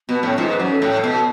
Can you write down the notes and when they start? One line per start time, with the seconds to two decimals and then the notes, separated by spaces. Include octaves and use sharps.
0.09 B2 B3
0.23 A2 C#4
0.37 G#2 F4
0.49 B4
0.59 F#2 F#4
0.71 A4
0.82 A2
1.04 B2